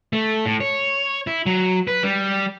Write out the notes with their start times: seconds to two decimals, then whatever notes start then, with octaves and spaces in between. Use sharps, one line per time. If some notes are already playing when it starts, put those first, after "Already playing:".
0.13 A3
0.46 A2
0.60 C#5
1.27 E4
1.46 F#3
1.87 B4
2.03 G3